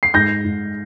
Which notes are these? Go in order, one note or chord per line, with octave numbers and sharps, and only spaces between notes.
C7
G#2 G6 A#6
G#2